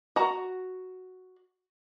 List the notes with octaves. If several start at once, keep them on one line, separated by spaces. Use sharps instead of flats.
F#4 A#5